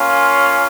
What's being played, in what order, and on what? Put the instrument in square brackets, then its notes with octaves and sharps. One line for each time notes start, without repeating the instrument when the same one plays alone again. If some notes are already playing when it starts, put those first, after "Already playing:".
Already playing: [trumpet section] A#3 C#4 F4